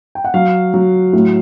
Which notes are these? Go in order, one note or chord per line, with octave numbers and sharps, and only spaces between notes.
G5
F#5
F#3 F5
F#3
A2